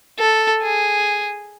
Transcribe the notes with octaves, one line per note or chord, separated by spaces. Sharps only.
A4
G#4